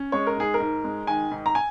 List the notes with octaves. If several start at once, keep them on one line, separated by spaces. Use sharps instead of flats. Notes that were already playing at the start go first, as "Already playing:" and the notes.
Already playing: C#4
G#3 C#5
A#4
G#2 G#4
A#4
G#2
G#3
D#3 G#5
G#2
A#5
G#5